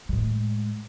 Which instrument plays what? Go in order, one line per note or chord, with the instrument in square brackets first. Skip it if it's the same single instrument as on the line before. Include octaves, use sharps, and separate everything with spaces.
[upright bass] A2 G#3